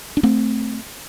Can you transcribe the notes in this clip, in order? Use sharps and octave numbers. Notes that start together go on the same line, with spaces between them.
D4
A3 C4